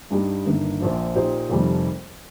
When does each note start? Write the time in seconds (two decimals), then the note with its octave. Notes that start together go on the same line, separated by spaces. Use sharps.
0.11 G2 G3 D#4 G4
0.45 G1 G2 D#3 A#3
0.80 A#1 A#2 F3
1.15 A#2 A#3 D#4 G4 C5
1.50 F1 F2 D#3 G3